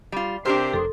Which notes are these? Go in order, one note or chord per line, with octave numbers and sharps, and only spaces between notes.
G3 F4
C3 D4 G4 A#4 C5 F6
F1 A4 C6 D#6